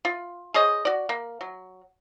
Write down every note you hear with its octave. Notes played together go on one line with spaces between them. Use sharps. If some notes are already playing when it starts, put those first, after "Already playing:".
F4
G#4 C5 C#5 D#5
F#4 D5
A#3
F#3